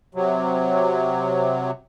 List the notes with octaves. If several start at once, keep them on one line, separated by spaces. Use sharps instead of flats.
C3 F#3